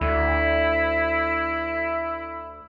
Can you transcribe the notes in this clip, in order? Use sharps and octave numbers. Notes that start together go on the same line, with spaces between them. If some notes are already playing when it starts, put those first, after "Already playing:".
D2 E4